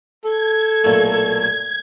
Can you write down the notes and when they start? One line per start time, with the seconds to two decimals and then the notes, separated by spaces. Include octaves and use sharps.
0.25 A4 G#6
0.84 B1 A#2 A3